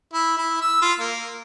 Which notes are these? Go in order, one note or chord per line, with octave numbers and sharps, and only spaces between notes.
E4
E4
E6
F4
A#3